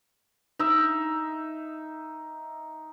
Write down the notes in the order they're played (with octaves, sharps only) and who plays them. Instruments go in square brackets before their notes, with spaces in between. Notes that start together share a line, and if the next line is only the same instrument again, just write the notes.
[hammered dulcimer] D#4 E5